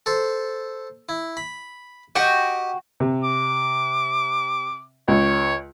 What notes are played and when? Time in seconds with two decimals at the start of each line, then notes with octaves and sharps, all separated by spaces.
0.06 A4 C5
1.09 E4
1.37 B5
2.15 F#4 G4 D#5 G5
3.00 C3
3.24 D6
5.08 C#2 C#5